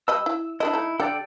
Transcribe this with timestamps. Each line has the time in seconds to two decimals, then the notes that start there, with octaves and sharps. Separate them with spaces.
0.08 G3 D#5 B5 E6
0.26 E4
0.60 D4 E4 A4 D#5
0.73 A3 D#4
1.00 D3 G4 A4 D5 G5